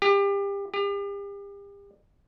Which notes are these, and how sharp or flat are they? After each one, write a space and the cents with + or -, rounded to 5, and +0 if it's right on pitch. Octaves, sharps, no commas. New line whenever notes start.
G4 +30
G4 +40